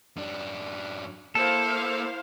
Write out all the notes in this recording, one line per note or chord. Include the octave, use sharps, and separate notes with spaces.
F#2 D4
A#3 E4 A4 C5 F5